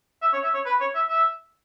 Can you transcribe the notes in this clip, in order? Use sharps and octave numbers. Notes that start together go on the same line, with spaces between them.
E5
C#5
E5
C#5
B4
C#5
E5
E5